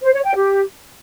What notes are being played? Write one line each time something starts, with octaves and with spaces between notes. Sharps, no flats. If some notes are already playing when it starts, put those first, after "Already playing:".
C5
C#5
G5
G4